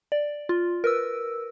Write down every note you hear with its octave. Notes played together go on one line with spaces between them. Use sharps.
D5
F4
A#4 B4 E6